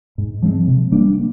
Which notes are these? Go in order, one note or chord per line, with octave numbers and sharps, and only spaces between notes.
G#2
F3 G#3 C4
C3
G3 A#3 D4